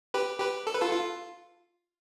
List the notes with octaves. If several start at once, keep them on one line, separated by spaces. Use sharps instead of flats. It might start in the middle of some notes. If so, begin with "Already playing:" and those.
G4 B4
G4 B4
A4
B4
F4 A4
F4